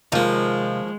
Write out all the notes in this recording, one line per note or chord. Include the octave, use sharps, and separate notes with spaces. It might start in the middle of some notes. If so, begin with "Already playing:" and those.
D#2 C3 F3 G#3 A#3 F4 D#5